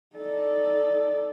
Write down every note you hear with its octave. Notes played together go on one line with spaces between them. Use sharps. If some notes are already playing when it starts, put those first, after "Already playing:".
D#4 A4 D5